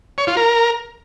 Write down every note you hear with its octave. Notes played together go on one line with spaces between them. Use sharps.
C#5
F4
A#4